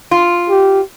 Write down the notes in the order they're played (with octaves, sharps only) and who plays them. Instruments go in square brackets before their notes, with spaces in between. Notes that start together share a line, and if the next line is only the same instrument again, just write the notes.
[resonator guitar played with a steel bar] F4
[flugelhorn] G4